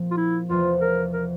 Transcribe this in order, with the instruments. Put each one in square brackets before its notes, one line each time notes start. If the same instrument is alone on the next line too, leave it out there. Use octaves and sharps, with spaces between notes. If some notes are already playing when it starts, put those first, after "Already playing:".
Already playing: [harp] A#2 F3 C4
[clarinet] F4
E4
[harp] E2 C3 F3 A3 [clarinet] F4
[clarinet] A#4
A#4